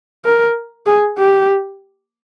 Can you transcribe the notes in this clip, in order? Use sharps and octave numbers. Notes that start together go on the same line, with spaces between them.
A#4
G#4
G4